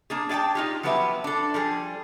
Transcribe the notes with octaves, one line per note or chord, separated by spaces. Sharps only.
A#3 D4 G#4
G#4 D5 F#5 G5 A5
D#4 F4 G4
F3 F#3 B3 G4 B4 E5
D4 A4
F3 G3 G#4